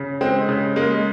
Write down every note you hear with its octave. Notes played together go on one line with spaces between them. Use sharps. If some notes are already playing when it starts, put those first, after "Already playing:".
Already playing: C#3
G#3 C4
C#3
G#3 A#3